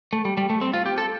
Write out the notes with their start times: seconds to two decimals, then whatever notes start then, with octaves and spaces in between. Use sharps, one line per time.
0.13 A3
0.25 G3
0.37 G3
0.50 A3
0.61 C4
0.73 F4
0.86 G4
0.98 A4